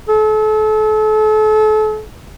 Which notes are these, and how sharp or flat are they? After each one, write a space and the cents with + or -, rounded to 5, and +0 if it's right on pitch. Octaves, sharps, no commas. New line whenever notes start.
A4 -35